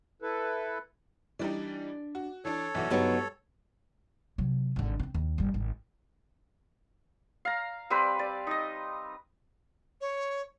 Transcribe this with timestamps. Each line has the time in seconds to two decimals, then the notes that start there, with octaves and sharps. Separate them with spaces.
0.22 E4 A4 B4
1.39 E3 G3 D4 D#4 D5
2.15 F#4
2.45 E3 D4 A4 C#5
2.75 B1 E3 F#4 D5
2.90 G2 C#3 F#3 G3 B3 D#4 C#6
4.38 C3 F#3
4.76 G#1 D3
5.00 B2 C4
5.14 D#2
5.38 G1 G3
5.54 G#1
7.45 F5 A#5
7.90 G3 C4 B4
8.19 D5
8.47 D#4 D#5
10.01 C#5